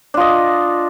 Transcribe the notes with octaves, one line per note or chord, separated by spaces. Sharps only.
D4 F4 D#5